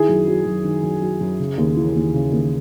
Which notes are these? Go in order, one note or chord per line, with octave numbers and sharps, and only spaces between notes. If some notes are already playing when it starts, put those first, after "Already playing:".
Already playing: D#3 E4 G#4
F#2
F#3
F#2
D#3
F#2
F#3
F#2
C#3
D#2
E3
D#2
C#3
D#2